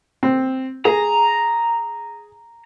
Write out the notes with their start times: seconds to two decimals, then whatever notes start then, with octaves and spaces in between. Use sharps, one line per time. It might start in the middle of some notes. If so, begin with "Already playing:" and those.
0.23 C4
0.85 G#4 A#5